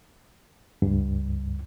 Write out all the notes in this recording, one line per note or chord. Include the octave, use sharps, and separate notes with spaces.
C#2 G2